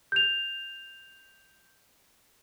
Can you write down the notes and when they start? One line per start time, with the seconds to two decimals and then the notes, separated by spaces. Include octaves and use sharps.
0.12 G6 F7